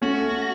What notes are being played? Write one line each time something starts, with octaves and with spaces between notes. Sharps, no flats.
A3 C#4 F#4